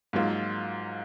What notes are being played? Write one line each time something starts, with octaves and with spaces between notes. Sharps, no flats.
G#2 F#3 A#3 F4